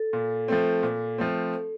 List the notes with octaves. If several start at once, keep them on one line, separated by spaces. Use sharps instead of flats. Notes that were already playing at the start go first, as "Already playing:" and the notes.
Already playing: A4
A#2
F3 A3 C4
A#2
F3 A3 C4